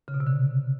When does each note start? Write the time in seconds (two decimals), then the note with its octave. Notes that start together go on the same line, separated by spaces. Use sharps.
0.08 C#3
0.14 B2
0.20 C3
0.27 D3